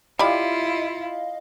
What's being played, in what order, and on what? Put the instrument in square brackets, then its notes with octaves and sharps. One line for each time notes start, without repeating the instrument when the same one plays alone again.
[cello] E4 F4 [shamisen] G4 D5 B5 [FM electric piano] D#5 F5